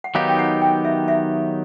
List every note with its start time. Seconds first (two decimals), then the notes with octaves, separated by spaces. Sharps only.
0.04 F#5
0.15 D#3 F#3 B3 D#4 G4 F5
0.29 G5
0.39 F#5
0.62 G5
0.85 E5
1.08 E5